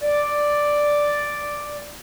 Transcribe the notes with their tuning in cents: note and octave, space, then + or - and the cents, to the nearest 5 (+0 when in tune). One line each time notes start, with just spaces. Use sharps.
D5 +0